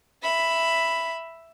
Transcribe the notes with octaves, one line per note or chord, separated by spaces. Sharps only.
E5 B5